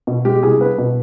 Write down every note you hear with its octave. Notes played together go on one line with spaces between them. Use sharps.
B2
G#3 G4
C2 G#4
B3 B4
B2